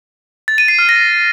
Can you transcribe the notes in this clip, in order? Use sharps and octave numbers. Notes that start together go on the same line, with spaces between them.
A6
D#7
C7
F6
A#6